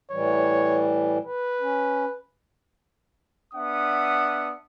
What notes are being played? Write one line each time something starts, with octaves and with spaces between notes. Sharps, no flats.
A2 E3 G3 C#5
B4
C#4
B3 D4 E5 F#5 D#6